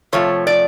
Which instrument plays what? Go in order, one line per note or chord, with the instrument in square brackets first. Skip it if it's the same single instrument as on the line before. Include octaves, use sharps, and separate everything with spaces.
[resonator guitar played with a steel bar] C3 F3 A3 C#5
D5